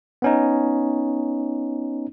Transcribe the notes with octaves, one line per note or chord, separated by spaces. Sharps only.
B3 C#4 D#4